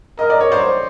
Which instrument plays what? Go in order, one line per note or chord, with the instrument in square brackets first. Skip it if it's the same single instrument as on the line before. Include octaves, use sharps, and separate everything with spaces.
[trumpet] A#4 [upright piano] D#5
[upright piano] D5
C#5
C5 D5